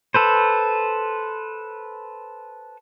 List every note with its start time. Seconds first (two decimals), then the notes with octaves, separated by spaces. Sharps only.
0.14 A4 B4 C5